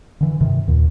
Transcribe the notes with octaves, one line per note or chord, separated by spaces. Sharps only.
D3 E3
G2 C3 D#3
D#2 A#2